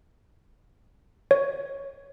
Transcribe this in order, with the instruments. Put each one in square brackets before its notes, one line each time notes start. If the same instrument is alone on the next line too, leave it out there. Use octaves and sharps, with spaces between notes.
[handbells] C#5